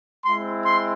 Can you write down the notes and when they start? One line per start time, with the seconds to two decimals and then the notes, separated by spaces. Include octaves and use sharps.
0.24 G#3 C4 E4 C6
0.65 C6